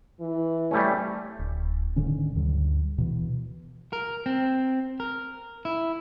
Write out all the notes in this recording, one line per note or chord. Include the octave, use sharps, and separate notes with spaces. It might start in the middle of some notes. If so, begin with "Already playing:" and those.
E3
G3 A3 C#4
D1
G#2 D3 D#3 C#4
D2 G2 D3 F#3
B2 E3
A#4
C4
A#4
E4